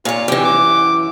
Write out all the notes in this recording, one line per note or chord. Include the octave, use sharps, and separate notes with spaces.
A#2 F4 C#5
F#2 E3 G4
D6